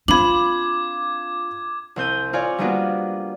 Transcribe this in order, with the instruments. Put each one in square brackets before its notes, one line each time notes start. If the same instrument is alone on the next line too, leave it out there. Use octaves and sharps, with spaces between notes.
[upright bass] C4 [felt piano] D4 F4 [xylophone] B5 F#7 [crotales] D6 G#6
[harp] C2 C4 G6 D#7
C4 F4 C#5 D5 F5 G#5
G3 A#3 B3 D4 F4 F#4